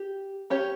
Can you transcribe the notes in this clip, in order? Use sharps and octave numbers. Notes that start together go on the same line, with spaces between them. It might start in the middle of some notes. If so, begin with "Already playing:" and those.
Already playing: G4
C#4 G4 C#5